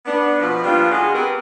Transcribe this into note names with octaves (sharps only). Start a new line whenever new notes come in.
B3 D4
B2 F3
F3 G3 A#3 B3 D4 F4
B2 G#3 F4 F#4 G#4
B3 C4 G4 A#4 B4